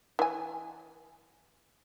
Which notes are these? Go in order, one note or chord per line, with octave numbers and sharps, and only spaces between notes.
E3 G#5